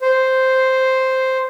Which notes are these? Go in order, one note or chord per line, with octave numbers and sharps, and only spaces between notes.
C5